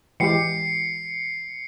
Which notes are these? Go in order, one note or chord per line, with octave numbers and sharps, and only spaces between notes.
E3 G#3 G4 C7 C#7